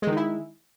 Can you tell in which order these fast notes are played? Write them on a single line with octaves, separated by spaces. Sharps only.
G#3 D#3 D#4 E4